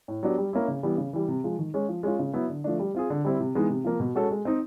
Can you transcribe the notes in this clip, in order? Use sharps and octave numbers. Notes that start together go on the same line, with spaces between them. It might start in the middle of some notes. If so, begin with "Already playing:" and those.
A2
F#3 B3 D4 G4
G3
A#3 C#4 E4
C#3
E3 G3 B3
C#3
E3 G3
C3
F3 G#3
D#3
G#3 C#4
F3
G#3 C#4 F4
C#3
F#3 B3 E4
D3
F3 A3 D4
G3
C4 F4 G#4
D3
G3 C4 E4
C3
E3 G#3 B3 D#4
C3
F3 A#3
B2
G#3 C#4 F#4 A4
G#3
C4 D#4